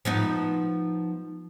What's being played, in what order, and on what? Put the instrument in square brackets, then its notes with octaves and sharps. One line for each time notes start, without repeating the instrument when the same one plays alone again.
[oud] F3 B3 D#4